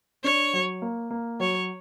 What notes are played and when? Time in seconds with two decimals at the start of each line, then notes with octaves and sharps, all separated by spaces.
0.24 D4 C#5
0.53 F#3
0.82 A#3
1.11 A#3
1.40 F#3 C#5